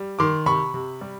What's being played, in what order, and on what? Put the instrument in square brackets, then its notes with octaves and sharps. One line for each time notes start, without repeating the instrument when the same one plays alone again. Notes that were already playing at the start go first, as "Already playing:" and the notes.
Already playing: [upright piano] G3
D#3 C6 D6
C3 B5 C#6
C3
G3